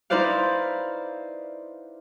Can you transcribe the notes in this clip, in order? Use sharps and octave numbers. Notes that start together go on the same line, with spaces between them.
D#4 E4 B4 C5 D5 F5